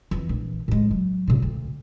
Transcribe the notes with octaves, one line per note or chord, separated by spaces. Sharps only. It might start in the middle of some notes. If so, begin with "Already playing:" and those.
F2 E3
A#1 E3
A2 G#3
F#3
A#2 C#3
D2